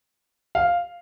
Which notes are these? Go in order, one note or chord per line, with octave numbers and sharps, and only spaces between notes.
F5